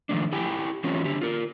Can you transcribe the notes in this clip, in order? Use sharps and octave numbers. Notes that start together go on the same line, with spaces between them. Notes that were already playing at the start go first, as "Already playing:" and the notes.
D#3 F3 A3 D4
E4 G4 G5 G#5
E3 F#3 A3 C4 C#4 F4
D3 G4
F4 A#4